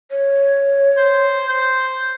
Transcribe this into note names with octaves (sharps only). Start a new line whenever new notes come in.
C#5
C5
C5